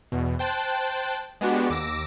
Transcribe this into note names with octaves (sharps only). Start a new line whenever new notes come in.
E2 B2
C5 G5 A5 F#6
G#3 B3 D4 F#4 G4
D#2 D6 E6 A#6